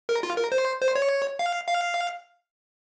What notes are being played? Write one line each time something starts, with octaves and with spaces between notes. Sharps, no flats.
A#4
F4
A#4
C5
C5
C#5
F5
F5